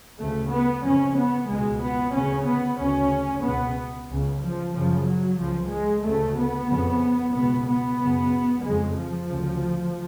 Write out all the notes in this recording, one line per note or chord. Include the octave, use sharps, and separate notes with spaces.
D2 C#3 A3
B3
F2 C#3 C#4
B3
C#2 B2 G#3
B3
D2 C#3 C#4
B3
D2 C#3 C#4
C#2 B2 B3
C#2 C#3
F3
F#2 C#3 F3
F#3
C#2 C#3 F3
G#3
D2 C#3 A3
B3
F2 C#3
C#2 B2 B3
B3
F#2 C#3
F2 C#3 G#3
F3
D2 C#3